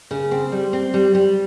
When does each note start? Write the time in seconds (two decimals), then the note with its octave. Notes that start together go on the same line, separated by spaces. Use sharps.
0.11 C#3
0.31 C4
0.52 G3
0.73 C4
0.94 G3
1.15 G3